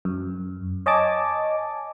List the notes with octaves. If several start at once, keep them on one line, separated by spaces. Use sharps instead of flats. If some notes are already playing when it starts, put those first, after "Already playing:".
F#2
C#5 D#5 G#5 A5 D6